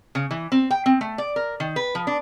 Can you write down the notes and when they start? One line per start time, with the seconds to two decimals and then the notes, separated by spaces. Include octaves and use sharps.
0.15 C#3
0.31 E3
0.52 C4
0.71 G5
0.86 C4
1.01 A3
1.18 D5
1.36 A#4
1.60 D#3
1.76 B4
1.95 F3
2.07 D4